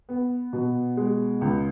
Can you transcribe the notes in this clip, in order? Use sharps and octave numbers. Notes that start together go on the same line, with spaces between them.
B3
B2
G#3
C#2